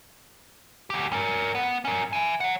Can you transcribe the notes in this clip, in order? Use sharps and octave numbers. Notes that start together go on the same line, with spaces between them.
D2 G4
C#4 A#4
B3
C#4 A#4
E5 G#5
C#5 F#5